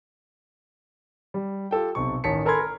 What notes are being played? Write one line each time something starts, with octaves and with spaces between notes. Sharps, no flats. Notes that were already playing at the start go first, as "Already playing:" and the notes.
G3
F4 G4 A4 G5
B1 C3 C#6
A1 D#3 C#5 A5 B6 C#7
A4 A#4 G#5 B5 C6 G#6
A#4